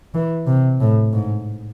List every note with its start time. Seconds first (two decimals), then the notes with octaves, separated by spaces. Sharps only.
0.14 E3
0.47 C3
0.80 A2
1.13 G#2